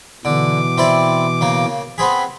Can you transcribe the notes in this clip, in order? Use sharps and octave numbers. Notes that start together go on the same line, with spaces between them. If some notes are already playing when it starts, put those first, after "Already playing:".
B2 D3 E3 D6
C4 E4 D5
C#3 A#3
B3 C4 G#4 B5